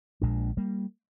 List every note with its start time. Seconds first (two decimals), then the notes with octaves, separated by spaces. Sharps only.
0.21 A#1 A#2 G#3 D4
0.57 G3 A#3